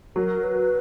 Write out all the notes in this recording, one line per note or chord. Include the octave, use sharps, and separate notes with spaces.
F#3 A#4
B4